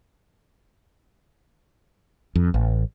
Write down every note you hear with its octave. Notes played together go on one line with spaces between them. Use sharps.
F2
A1